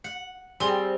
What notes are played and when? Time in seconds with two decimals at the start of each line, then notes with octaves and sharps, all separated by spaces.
0.04 F#5
0.60 G3 C4 G#4 G7